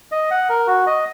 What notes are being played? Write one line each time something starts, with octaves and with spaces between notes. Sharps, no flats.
D#5
F#5
A#4
F#4
D#5